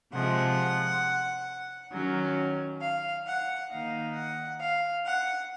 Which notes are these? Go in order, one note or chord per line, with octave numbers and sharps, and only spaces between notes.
C3 F3 G#3 F#5
D#3 F#3 C#4
F5
F#5
D#3 A#3 D#4 F5
F#5
F5
F#5